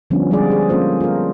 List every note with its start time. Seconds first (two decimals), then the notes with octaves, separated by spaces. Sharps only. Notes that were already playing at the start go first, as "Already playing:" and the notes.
0.10 D3 F3 G3 B3 C#4 D4
0.31 F3 G3 G#3 F4 G#4 D5
0.52 G#4
0.69 A#3 C4 C#4 F4 A4 C5
1.01 F4 A#4